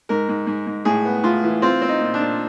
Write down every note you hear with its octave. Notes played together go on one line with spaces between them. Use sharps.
G#2 A#4
G#2
G#2
G#2
A2 G#4
B3
A2 F4
E3
C4 F4
C4
D#4
A#2
D4
A#2